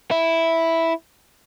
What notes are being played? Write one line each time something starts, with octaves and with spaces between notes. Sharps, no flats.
E4